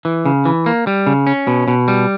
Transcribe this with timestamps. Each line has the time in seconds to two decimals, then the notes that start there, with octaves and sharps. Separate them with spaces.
0.05 E3
0.26 C#3
0.45 E3
0.66 A#3
0.87 G3
1.07 C#3
1.27 C#4
1.47 B2
1.68 B2
1.88 G3